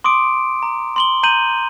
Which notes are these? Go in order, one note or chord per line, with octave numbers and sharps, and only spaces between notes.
C6 D6 D#6 D7
A#5
C6 F#7 G7
A#5 G6 D#7 F#7